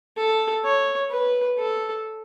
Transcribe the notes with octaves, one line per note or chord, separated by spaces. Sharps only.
A4
C#5
B4
A4